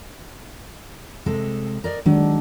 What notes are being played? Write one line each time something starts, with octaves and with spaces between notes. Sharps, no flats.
C3 G#3 A4
A#4 D5 D#5
D#3 F#3 G#3 D4